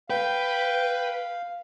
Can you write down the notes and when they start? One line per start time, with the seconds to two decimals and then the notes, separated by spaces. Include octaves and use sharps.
0.10 B4 F5 G5